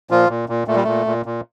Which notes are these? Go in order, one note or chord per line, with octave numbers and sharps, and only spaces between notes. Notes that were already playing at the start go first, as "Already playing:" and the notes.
A#2 F3 F4
A#2
A#2
A#2 A3
G3
A#2 A3
A#2
A#2